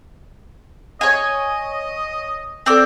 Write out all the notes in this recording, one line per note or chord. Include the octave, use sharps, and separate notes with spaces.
C#5 D#5 G#5
C4 A4 D5 D6 E6